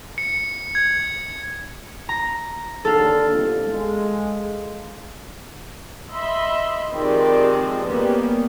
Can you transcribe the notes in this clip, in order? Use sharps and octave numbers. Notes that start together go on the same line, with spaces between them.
C#7
G#6
A#5
D#2 D3 A4 F5
G1 C2 F2
G#3
D#5 E5 B5 C6
D#3 F3 G#3 C4 G4 D5
G3 A#3 B3 C#4